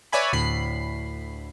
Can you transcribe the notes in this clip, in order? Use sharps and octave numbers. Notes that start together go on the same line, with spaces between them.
B4 C#5 D5 E5 G#5 B5
D2 A2 B5 C7